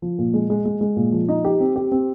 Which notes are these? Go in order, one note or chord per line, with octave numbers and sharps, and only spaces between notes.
F3
A#2
G#3
G#3
G#3
G#3
A#2
F3
D#4
G4
C4
G4
C4